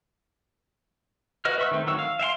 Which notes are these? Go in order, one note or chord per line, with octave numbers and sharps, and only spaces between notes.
F#4 B4 D#5 F6
B4 E5 C#6 E6
D#3 A3 C4
D#3 F#3 C#6 E6
F5
E5 F5 G5 C6